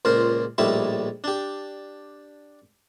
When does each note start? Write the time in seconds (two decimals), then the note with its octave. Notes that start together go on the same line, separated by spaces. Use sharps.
0.05 C#2 A#2 A#4 C5
0.58 A#1 A2 G3 D#4 E5
1.24 D4 G4